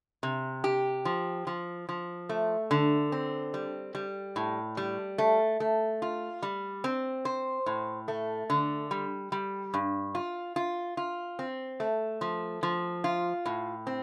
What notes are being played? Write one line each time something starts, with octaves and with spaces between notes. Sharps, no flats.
C3
G4
F3
F3
F3
A3
D3
C4
G3
G3
A2
G3
A3
A3
F4
G3
C4
C5
A2
A3
D3
G3
G3
G2
F4
F4
F4
C4
A3
F3
F3
F4
A2
C4